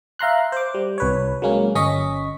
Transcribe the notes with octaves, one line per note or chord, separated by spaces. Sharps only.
E5 F5 A#5 C6 F#6
C5 D6
G3
C2 B4 C#5
F#3 G#3 A#3 C#4
G1 C#4 D#5 C#6 B6